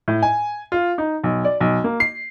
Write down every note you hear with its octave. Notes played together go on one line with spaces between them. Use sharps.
A2
G#5
F4
D#4
B1
D5
B1
A#3
C7